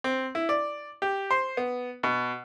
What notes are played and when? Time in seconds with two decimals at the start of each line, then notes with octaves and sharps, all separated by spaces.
0.04 C4
0.35 E4
0.49 D5
1.02 G4
1.31 C5
1.57 B3
2.03 B2